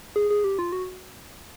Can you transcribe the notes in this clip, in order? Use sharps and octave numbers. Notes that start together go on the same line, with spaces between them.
G#4
G#4
G4
F4
F#4